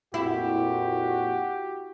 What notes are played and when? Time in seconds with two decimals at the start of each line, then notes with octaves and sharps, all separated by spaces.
0.14 F2 A#2 E4 F#4 G4